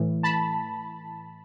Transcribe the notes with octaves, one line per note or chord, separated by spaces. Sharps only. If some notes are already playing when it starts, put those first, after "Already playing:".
Already playing: A2 E3
A5 B5